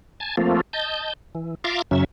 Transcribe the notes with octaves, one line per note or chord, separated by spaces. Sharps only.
G#5 A5
F3 A3 A#3 C4 F4
D#5 A5 G6
E3
F4 E5 F5 A#5 C6 D6
F#2 C#3 F#3 C#4 E5